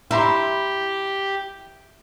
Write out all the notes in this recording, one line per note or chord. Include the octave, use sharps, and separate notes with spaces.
E4 G4 E5 A#5 C6